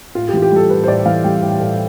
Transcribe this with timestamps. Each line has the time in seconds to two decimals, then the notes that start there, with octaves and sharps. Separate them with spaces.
0.15 A2 F4
0.28 G4
0.33 E3 F4
0.42 G4
0.51 G3 A4
0.70 A2 B4
0.84 C5
0.88 A2 D5
1.06 E3 F5
1.24 G3 G5
1.43 A2
1.60 A2